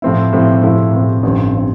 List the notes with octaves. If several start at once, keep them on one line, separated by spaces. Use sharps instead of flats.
A2 F3 C4 E4
A2 F3 C4 E4
A2 F3 C4 E4
A2 F3 C4 E4
A1 G2 D3 F3 C4
D3 F3 C4